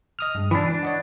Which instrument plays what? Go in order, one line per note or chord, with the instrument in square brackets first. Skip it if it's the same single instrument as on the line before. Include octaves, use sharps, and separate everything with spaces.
[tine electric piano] D#5 D#6 F6
G2 G#3
[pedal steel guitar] E3 D4 [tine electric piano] B4
[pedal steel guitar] D4
[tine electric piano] C#5 D#5 F#5